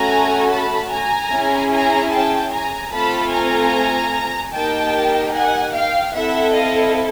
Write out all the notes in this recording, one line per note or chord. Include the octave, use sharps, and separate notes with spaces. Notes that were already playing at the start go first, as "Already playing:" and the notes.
Already playing: A3 C#4 F#4 A4 G#5 A#5
A5 B5
G#5 A#5
C#4 E4 G#4
G#5 A#5
G5 A5
G#5 A#5
A3 C4 F4 A4 A5 B5
G#5 A#5
A#3 D#4 G4 G5 A5
F#5 G#5
F5 G5
C4 E4 A4 E5 F#5
D#5 F5